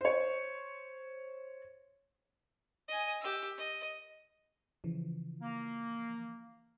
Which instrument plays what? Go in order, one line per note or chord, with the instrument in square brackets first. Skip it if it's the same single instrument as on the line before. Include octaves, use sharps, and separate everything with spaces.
[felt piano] C5 C#5
[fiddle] D#5 G#5
G4 E6
D#5
[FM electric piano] C#3 E3 F3
[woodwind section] A#3